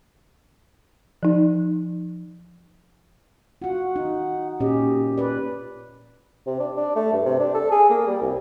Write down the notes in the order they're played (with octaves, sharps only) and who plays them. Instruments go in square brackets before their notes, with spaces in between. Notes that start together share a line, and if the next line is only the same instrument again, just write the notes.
[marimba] F3 D#4
[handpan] F4 F#4 [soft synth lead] F#5
[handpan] D#4
[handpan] A#2 C#4 D#5 [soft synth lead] G4
[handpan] B4 D5
[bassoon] C3
D4
D4
A3
G2
C3
D4
A4
G#4
A#3
G3
C2